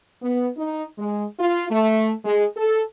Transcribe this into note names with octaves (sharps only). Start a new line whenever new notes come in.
B3
D#4
G#3
F4
A3
G#3
A4